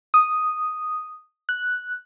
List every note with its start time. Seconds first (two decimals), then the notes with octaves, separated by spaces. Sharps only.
0.14 D#6
1.49 F#6